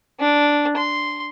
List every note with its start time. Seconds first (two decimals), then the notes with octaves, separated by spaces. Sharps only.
0.20 D4
0.77 C6